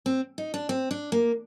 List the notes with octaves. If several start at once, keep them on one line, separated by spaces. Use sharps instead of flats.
C4
D#4
D4
C4
D4
A#3